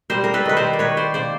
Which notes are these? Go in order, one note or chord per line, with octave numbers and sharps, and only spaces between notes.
G3 A#4 C5
A#4
A4 B4
D#3 B4
A#4 C5
D5
D#3 B4 C#5
C5 D5
A#3 C5 D5